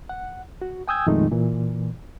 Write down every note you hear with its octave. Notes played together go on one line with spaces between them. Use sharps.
F#5
F#4
G5 G#5 D#6 E6 G6 G#6
F2 A#2 D#3 G#3 A3 D#4
A#2 E3